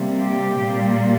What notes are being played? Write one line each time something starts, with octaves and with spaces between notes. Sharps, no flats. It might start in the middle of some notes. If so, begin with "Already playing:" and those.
Already playing: C3 G3 A#3
G4
A#2 G3 A#3